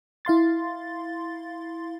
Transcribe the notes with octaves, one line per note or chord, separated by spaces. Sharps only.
E4 F5 C6 A6